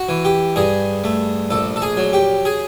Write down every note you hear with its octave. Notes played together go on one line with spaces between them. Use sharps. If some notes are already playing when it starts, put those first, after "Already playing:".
Already playing: F#4
E3
G4
G2 G#4
A3
A#1 A4
A4
G#4
F#3
G4
G#4